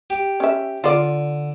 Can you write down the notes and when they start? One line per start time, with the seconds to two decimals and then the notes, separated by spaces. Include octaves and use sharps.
0.10 G4
0.40 C#4 E5
0.84 D3 F4 D5